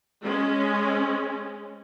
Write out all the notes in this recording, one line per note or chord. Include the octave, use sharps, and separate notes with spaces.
G#3 C#4